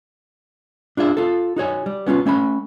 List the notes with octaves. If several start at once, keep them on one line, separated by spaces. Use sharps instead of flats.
D4 F4 G#4 E5
F4 A4
D#4 F#4 C#5 G#5
G3
B3 C#4 D4 F4
A3 C#4 E5 B5